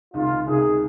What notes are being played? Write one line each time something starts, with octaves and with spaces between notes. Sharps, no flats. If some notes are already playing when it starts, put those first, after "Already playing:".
C#2 C3 D#3 F4
C#2 C3 D#3 G#4